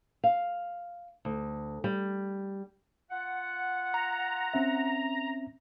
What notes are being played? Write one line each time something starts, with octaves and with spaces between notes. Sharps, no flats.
F5
D2
G3
F4 F#5
A#5
C4 C#4 E5